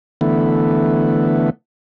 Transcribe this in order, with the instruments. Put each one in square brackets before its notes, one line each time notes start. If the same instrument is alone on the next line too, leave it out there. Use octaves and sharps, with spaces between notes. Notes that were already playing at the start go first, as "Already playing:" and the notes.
[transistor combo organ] D3 E3 A3 B3